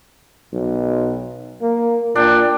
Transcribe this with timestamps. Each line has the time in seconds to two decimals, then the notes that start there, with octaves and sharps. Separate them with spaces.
0.53 B1
1.61 A#3
2.15 A#2 D4 G5